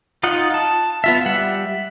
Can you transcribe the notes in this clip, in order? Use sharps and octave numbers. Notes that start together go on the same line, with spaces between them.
D#4 F4 D#5 F#5
A5
B3 F4 E5
G3 E5 F#5